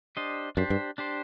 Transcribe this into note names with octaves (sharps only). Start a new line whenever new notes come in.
D4 G4 C5 D#5
F#2 D4 G4 C5
G2
D4 G4 C5